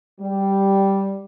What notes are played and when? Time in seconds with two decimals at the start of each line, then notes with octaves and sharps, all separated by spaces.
0.20 G3